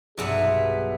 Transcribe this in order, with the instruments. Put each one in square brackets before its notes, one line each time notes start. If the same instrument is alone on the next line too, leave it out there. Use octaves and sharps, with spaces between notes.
[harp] B1 G2 [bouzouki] C3 E3 B3 [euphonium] G#4